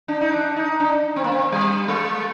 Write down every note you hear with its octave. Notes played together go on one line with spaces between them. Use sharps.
D4
D#4
D4
D#4
D4
C4
A#3
C4
G3
G#3